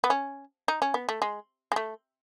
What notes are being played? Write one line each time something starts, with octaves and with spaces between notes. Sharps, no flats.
B3
C#4
D#4
C#4
B3
A3
G#3
G#3
A3